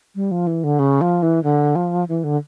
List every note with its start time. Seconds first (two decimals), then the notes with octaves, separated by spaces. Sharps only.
0.15 G3
0.31 F3
0.47 E3
0.64 D3
0.79 C#3
1.01 F3
1.22 E3
1.43 D3
1.75 F3
2.09 E3
2.24 D3